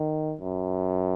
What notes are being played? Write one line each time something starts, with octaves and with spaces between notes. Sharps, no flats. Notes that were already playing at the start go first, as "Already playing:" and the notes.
Already playing: D#3
F#2